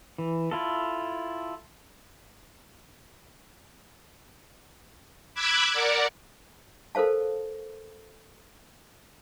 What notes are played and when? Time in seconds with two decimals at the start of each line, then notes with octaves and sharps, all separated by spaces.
0.18 E3
0.51 E4 F4 A4
5.34 B5 D6 E6 F#6 G#6
5.73 A#4 D5 F#5
6.95 A4 A#4 C5 F5 A5